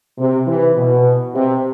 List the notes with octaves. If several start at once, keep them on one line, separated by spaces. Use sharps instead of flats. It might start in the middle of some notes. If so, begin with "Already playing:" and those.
C3
E3
B2
C3